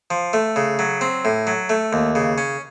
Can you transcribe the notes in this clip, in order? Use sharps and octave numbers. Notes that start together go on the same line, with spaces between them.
F3
A3
C#3
F#3
C4
A2
F#3
A3
D#2
C#3
C#4